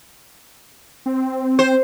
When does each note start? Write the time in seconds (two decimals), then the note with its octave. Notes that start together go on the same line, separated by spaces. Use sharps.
1.06 C4
1.59 C5